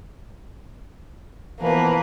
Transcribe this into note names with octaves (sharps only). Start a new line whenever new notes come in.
B2 E3 F3 A#3 B4